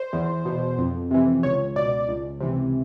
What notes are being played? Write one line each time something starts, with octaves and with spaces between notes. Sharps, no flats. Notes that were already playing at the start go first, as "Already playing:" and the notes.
Already playing: C5
E2
B2
F2
C3 E3
C#2 C#5
B2 D5
C#2
C3 E3